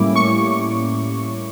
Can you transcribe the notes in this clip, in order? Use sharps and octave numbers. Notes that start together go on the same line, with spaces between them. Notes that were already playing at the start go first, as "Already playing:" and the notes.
Already playing: A2 G3 A#3 C#4 E4 D6
C#6